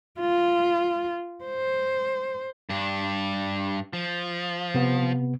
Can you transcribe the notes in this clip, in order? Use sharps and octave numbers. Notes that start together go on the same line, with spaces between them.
F4
C5
G2 D4
F3
C3 B3